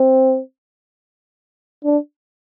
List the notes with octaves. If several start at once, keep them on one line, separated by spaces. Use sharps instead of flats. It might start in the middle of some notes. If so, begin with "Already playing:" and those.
Already playing: C4
D4